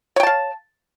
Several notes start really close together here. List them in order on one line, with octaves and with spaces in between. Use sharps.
C#5 G5 A5 F5